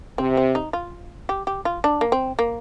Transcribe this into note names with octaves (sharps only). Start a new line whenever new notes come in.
C3 C4
C4
D#4
F4
G4
G4
F4
D4
A#3
C4
A#3